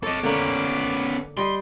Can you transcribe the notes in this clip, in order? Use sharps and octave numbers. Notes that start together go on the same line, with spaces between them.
A4 C#5 D#5 D6
D3 A#3 B3 C#4
G3 G4 D#5 C6